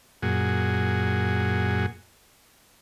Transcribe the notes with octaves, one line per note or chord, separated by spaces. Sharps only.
F#2 A#2 F#4 G#4